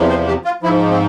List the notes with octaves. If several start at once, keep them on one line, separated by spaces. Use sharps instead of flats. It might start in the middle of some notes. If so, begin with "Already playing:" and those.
Already playing: E2 C3 F3
C5
G4
F4
G#2 F3 E4
C4